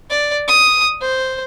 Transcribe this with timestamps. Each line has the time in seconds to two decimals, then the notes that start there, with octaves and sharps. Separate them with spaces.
0.10 D5
0.48 D#6
1.02 C5